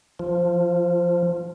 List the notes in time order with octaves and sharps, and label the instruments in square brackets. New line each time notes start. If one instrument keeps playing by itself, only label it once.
[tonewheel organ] F3